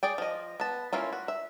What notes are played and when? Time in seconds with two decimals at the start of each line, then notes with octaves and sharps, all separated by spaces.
0.03 G#4 D5 G5
0.18 F3 D#5
0.60 B3 A5
0.93 A#3 C#4 E4 F4
1.13 F#4
1.28 E5